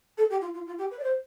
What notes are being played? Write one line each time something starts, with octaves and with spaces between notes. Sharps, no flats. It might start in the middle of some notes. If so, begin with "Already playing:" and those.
A4
G4
F4
F4
F4
G4
B4
D5
C5